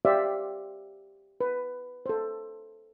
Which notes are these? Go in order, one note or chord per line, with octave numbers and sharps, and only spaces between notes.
G4 C5 D5 E5 F5
B4
A4 C5